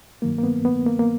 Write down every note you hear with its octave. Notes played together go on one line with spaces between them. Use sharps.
G2 D#3 F#3 A#3
A#3
B3
B3
A#3
A#3